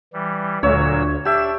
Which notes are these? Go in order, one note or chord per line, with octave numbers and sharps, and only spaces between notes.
E3 G3
D2 A#2 F#3 C#5 E6
D4 G4 E5 E7